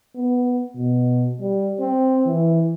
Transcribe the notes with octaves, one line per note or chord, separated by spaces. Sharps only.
B3
B2
G3
C4
E3